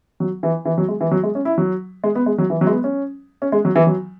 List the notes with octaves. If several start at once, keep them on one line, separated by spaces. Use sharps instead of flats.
F#3
E3
E3
F#3
G#3
E3
F#3
G#3
C#4
E4
F#3
G#3
B3
G#3
F#3
E3
F#3
G#3
B3
C#4
C#4
G#3
F#3
E3
F#3